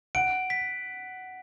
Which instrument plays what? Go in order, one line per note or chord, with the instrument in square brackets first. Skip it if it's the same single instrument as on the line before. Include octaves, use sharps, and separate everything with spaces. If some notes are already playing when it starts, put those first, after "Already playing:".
[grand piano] F#5 [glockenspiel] D7
[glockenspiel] B6